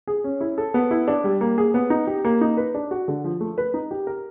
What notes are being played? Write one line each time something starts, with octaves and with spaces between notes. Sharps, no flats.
G#4
C#4
E4
A4
B3
E4
D4
G3
A#3
G#4
B3
D#4
G4
A#3
D#4
B4
D4
F#4
D3
F3
A3
B4
D#4
G4
A#4